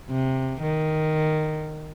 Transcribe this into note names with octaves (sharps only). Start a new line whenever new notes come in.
C3
D#3